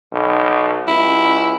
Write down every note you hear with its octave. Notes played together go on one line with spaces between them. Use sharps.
B1
C#2 E4